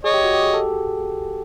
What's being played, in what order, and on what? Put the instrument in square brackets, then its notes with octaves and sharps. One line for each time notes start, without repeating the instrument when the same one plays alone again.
[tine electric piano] G#4 [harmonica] C#5 D#5
[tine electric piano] G4
F#4
G4
G#4
A4